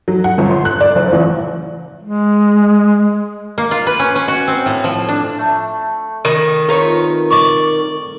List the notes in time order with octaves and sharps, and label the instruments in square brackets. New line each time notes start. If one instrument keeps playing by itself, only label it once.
[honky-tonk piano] F#3
F#5
G1
C6
F#6
D5
F#1
A1
[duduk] G#3
[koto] A#3
F4
B4
C#4
C#4
F#4
C4
A2
F3
D4
[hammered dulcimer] A3
[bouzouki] D#3
[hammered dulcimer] C4 F4 [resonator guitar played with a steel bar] A#4 B4 C#5
[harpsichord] D5 C#6